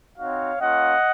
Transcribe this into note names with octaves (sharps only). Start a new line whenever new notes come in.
C4 D#4 F#4 C#5 F5
A#3 C#4 F4 D#5 F#5